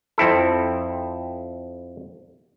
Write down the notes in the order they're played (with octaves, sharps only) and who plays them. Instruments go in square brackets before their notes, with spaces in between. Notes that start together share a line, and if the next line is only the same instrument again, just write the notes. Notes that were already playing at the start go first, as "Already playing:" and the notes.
[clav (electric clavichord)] F2 C4 E4 A4